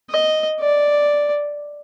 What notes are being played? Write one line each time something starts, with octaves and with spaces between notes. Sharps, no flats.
D#5
D5